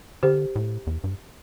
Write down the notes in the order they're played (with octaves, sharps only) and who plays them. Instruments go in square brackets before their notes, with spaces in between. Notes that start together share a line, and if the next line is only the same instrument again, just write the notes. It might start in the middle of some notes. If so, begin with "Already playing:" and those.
[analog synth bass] D3 [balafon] G4 C5
[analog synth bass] A2
E2
G2